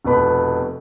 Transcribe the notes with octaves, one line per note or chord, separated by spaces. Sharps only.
F1 B2 B4 B5